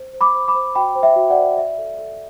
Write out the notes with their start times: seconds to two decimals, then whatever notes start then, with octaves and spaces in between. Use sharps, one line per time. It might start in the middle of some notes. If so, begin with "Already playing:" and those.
Already playing: C5
0.13 C5
0.21 B5 D6
0.35 C5
0.48 B5 D6
0.55 C5
0.75 F#4 G5 B5
0.95 C5
1.03 E5 G5
1.16 F#4
1.30 D5 F#5
1.37 C5
1.57 D5 E5
1.78 A4
1.99 A4